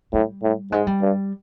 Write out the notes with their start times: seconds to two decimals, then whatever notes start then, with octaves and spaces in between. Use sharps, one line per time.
0.13 A2 G3
0.43 A2
0.72 G#2 G#3
0.87 G3
1.02 G2